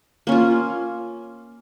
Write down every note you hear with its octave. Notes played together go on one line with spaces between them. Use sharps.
A#3 C#4 F4